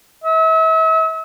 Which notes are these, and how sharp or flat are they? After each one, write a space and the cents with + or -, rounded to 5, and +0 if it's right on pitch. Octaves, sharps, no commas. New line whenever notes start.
E5 -40